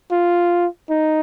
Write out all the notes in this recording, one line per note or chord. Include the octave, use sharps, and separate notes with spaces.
F4
D#4